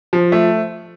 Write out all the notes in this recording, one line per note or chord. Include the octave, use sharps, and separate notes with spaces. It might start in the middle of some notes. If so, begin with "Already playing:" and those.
F3
A3